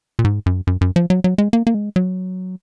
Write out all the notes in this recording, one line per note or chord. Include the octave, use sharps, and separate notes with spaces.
A#2
G#2
F#2
F#2
F#2
F3
F#3
F#3
G#3
A#3
A#3
G#3
F#3